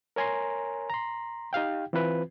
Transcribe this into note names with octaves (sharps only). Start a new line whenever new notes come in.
A#4 C#5 G#5 A#5 C6
A#5 C6
D#4 G4 F5 G5
E3 C4 F4 B4